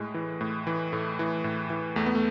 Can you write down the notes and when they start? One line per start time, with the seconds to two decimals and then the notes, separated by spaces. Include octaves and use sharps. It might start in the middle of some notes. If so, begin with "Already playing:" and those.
Already playing: A2 G#3
0.14 E3
0.41 A2
0.67 E3
0.92 A2 A3
1.19 E3
1.44 A2
1.70 E3
1.96 E2 A3
2.06 B3
2.15 A3